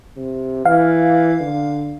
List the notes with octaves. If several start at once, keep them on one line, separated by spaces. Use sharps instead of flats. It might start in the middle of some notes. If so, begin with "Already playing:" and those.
C3
E3 F5
D3